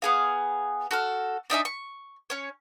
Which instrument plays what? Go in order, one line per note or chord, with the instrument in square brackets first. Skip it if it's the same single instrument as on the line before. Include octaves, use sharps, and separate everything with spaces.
[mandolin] B3 G#4 F5
F#4 A4 F6
D4 D#4 E5 G#5
C#6
C#4 C#5